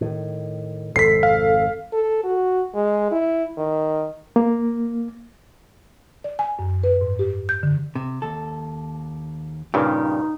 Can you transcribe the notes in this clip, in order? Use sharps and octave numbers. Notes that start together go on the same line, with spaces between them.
A2 D#3
G#1 F2 C3 A4 B6 C7
F5
A4
F#4
G#3
E4
D#3
A#3
D5
G#5
F#2
B4
G#2
G4
G6
D3
C3
D#2 A4
G2 A#2 C#3 D#4 G4